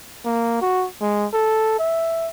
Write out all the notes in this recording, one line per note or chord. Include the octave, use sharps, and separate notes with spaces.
A#3
F#4
G#3
A4
E5